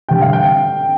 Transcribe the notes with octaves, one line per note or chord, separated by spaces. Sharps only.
D3 G3 G5
F5
G5